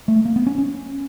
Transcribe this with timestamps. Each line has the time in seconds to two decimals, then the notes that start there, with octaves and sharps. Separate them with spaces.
0.08 A3
0.25 A#3
0.36 B3
0.46 C#4
0.58 C#4